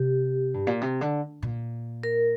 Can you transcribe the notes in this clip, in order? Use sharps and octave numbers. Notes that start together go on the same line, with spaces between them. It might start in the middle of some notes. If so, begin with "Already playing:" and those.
Already playing: C3 G4
G2
A#2
C3
D3
A#2
A#4